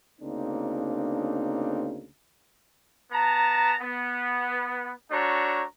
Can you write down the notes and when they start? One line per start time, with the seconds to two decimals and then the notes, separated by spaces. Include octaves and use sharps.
0.22 D2 C#3 A#3 C4 D4 D#4
3.11 B3 A5 A#5
3.80 B3
5.11 A3 D4 F#4 C#5 A#5